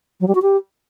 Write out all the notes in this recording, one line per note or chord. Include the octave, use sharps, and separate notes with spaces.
F#3
G3
F#4
G4